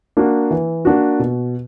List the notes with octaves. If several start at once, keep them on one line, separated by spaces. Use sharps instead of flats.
A#3 D4 F#4
E3
A#3 D4 F#4
B2